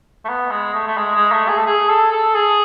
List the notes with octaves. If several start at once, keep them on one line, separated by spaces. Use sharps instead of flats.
A3
B3
G#3
A3
A3
G#3
G#3
A3
G#4
A4
G#4
A4
A4
G#4